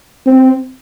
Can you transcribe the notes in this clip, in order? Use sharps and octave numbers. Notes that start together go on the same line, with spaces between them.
C4